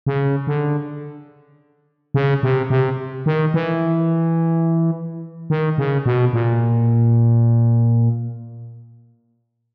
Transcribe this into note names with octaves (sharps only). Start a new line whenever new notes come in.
C#3
D3
C#3
C3
C3
D#3
E3
D#3
C#3
B2
A#2